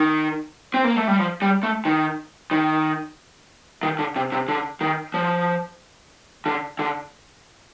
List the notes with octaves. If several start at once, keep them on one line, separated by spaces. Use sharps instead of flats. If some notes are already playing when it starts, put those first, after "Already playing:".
Already playing: D#3
C4
A#3
A3
G3
F3
G3
A3
D#3
D#3
D#3
D3
C3
C3
D3
D#3
F3
D3
D3